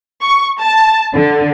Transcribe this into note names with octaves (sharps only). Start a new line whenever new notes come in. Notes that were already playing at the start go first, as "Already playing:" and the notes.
C#6
A5
D3